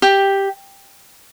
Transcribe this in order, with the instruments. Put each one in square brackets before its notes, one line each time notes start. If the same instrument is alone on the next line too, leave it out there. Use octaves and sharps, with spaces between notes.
[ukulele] G4